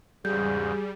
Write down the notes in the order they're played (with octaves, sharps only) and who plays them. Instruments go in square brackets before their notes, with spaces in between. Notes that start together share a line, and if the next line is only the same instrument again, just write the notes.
[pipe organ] E2 G#2 C#3 [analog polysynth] G3 [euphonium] G#4 [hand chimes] G6